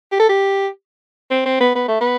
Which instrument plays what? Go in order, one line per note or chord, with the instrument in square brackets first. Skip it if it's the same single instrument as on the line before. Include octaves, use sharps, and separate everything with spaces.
[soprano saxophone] G4
A4
G4
C4
C4
B3
B3
A3
B3